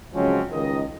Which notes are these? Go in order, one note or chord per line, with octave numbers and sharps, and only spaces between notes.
C#3 F3 F#3 G#3 C4 C#4
C#2 D#3 D#5